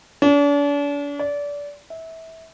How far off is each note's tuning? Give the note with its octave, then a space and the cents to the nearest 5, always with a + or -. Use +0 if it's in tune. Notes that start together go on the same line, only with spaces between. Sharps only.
D4 -40
D5 -25
E5 -25